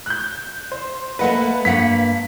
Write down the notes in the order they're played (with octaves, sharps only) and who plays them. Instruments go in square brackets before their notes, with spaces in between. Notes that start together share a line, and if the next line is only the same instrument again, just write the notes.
[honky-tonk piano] F#6 G6
C5
[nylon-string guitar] A3 A#3 D#5 [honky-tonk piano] B4 F#5
[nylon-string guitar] G2 A#3 F#5 [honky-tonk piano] B6